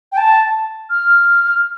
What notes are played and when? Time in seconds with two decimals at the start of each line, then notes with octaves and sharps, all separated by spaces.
0.12 G5
0.17 A5
0.90 F6